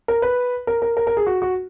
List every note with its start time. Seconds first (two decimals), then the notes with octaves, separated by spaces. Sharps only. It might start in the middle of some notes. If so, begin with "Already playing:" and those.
0.08 A#4
0.22 B4
0.67 A#4
0.82 A#4
0.97 A#4
1.07 A#4
1.17 G#4
1.26 F#4
1.42 F#4